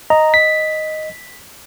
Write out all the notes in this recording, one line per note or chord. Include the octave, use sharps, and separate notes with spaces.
D#5 A#5
B6